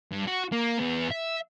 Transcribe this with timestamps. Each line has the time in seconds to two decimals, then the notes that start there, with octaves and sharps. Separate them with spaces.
0.12 G2
0.27 F#4
0.52 A#3
0.80 E2 B3
1.12 E5